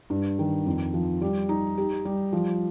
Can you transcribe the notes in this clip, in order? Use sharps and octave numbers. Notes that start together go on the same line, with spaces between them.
G2
D#3
F2
F3
G3
D#4
G4
G3
F3